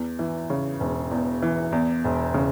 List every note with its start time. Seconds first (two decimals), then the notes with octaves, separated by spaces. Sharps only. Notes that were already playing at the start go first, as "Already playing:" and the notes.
Already playing: E2
0.19 E3
0.50 C#3
0.80 E1
1.11 E2
1.42 E3
1.72 E2
2.04 E1
2.34 C#3